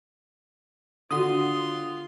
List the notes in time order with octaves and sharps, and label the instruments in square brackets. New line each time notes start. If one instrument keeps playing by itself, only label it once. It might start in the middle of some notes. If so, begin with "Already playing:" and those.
[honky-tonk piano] D3 F#4 [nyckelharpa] F4 C6 [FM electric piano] D#6